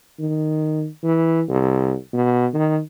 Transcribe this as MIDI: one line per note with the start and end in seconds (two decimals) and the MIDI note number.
0.19 0.86 51
1.03 1.43 52
1.49 1.95 36
2.13 2.46 47
2.54 2.80 51